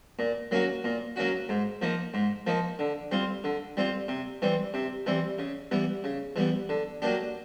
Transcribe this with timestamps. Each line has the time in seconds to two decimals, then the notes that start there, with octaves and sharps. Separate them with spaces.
0.19 A#2
0.51 F#3 A#3 C#4 F#4
0.84 A#2
1.16 F#3 A#3 C#4 F#4
1.49 G#2
1.82 F3 A#3 D#4
2.14 G#2
2.47 F3 A#3 D#4
2.79 D3
3.11 G3 C4 F4
3.44 D3
3.77 G3 C4 F4
4.08 C3
4.42 E3 G3 C4
4.74 C3
5.06 E3 G3 C4
5.39 C#3
5.71 E3 G3 B3
6.04 C#3
6.36 E3 G3 B3
6.69 D3
7.02 F#3 A#3 D4 G4